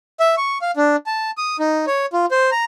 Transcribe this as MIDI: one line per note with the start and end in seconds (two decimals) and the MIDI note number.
0.20 0.35 76
0.37 0.58 85
0.62 0.71 77
0.77 0.96 62
1.06 1.31 81
1.37 1.57 87
1.59 1.85 63
1.87 2.06 73
2.13 2.26 65
2.31 2.50 72
2.52 2.65 82